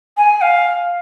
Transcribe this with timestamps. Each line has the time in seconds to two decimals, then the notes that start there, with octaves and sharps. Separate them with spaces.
0.17 G#5
0.41 F5